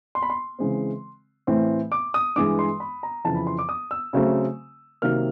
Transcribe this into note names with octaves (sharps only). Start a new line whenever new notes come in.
C6
B5
C6
C#3 E3 G#3 C4
A2 E3 A3 C4
D6
D#6
G2 E3 G#3 D6
C6
B5
A#5
F2 C#3 E3 A5
B5
C6
D6
D#6
E6
C#3 F#3 A3 C4
C3 D#3 F#3 A#3 F6